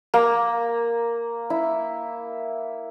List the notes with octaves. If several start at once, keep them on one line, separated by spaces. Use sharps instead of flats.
A#3
E4